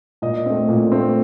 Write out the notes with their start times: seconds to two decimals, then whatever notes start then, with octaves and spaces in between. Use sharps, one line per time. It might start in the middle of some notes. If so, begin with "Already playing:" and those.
0.22 A#2 D#5
0.46 A3 C4
0.69 A#2
0.92 A3 C4